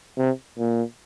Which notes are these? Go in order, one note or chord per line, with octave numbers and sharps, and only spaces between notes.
C3
A#2